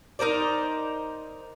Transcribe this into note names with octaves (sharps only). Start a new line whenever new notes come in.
D#4 A#4 C5 D5